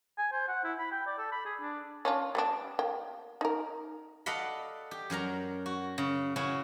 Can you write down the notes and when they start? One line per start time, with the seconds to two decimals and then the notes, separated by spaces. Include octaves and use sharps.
0.18 G#5
0.32 C5
0.48 F#5
0.64 E4
0.79 B5
0.92 G5
1.07 D5
1.18 A4
1.32 B5
1.46 G#4
1.61 D4
2.05 C#4 D4 F4
2.35 G3 B3 D4
2.79 A#3 G5
3.41 D#4 A#4
4.26 A4 D5 D#5 F5 F#5 B5
4.91 G4
5.10 F#2 F#3 A#4 A#5
5.66 F#4
5.98 C#3
6.36 C#3 C#4 E4 F#4